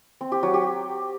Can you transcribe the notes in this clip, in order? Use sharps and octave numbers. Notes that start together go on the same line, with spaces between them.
C4
G4
F#3
G4